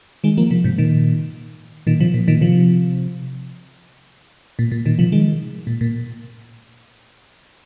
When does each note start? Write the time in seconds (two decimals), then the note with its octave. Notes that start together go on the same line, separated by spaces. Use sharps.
0.24 D#3 G#3
0.37 F3 A#3
0.51 C3 F3
0.64 G#2 C3
0.78 A#2 D#3
1.87 A#2 D#3
2.00 C3 F3
2.14 A#2
2.28 A#2 D#3
2.41 C3 F3
4.59 A#2
4.72 A#2
4.86 A#2 D#3
4.99 C3 F3
5.12 D#3 G#3
5.67 A#2
5.81 A#2